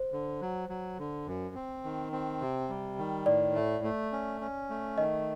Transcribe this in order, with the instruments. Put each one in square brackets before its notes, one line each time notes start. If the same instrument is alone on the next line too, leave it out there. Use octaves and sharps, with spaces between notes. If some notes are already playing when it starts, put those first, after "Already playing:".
Already playing: [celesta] C5
[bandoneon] D3
F#3
F#3
D3
F#2
C4
D#3
C4
C3
G3
D#3
[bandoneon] A2 [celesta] D5
[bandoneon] A3
A3
C#4
C#4
A3
[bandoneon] D#3 [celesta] D#5